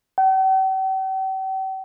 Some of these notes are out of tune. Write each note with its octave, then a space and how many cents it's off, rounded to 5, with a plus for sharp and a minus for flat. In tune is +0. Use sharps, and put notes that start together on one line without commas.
G5 -45